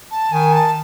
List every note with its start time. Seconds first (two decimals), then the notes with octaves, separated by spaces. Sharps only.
0.11 A5
0.32 D#3 G#5
0.53 A5